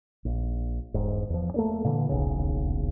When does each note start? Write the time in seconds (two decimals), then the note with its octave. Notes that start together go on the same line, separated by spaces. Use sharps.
0.25 A#1
0.94 E1 G#2
1.30 E2 F3
1.54 A3 A#3 D4
1.84 A#2 D3 E3
2.09 D#1 B1 E2 C#3